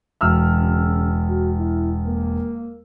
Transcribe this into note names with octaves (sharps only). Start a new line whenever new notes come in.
E1 E6 F6
C#3
F#4
E4
A#3